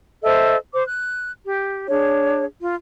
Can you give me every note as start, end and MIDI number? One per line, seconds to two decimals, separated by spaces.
0.23 0.56 69
0.23 0.56 72
0.23 0.56 75
0.23 0.56 76
0.73 0.83 72
0.73 0.83 86
0.86 1.31 90
1.45 1.87 67
1.88 2.45 62
1.88 2.45 68
1.88 2.45 73
2.61 2.73 65